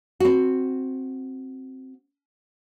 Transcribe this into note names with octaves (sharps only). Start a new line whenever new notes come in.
C4 F#4